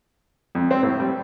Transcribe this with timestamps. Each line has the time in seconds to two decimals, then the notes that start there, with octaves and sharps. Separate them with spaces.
0.55 F2
0.71 C4
0.83 A2
1.00 G3